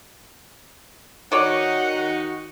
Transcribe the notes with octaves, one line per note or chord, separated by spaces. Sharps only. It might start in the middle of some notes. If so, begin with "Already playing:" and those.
D#3 D#4 F#4 C#5 D5 F#5